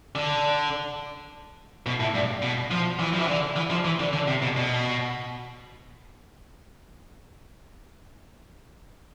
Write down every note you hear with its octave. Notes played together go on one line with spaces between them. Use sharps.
D3
B2
A2
G2
B2
F3
E3
F3
E3
D3
E3
F3
E3
D3
D3
C3
B2
B2